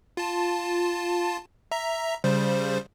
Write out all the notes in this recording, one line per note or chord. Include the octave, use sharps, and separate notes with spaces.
F4 A5
E5 A#5
C#3 G3 C5